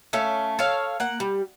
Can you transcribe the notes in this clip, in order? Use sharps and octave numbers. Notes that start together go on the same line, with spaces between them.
A3 C#4 A4 F5
A4 C#5 F5
A#3 F#5
G3